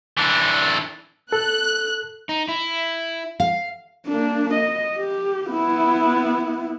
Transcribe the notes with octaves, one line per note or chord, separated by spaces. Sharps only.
E3 D4
A4 F#6
D#4
E4
F5
A#3 D4
D#5
G4
B3 E4